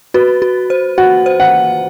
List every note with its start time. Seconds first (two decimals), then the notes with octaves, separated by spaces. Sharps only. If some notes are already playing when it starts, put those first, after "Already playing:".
0.14 F#4 B4
0.42 F#4
0.70 C5
0.98 F#4 F#5
1.26 C5
1.40 F#5